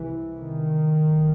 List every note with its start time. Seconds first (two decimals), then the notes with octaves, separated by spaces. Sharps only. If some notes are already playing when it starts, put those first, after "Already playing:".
Already playing: C2 C3 E3
0.39 D#3
1.01 G1 F#2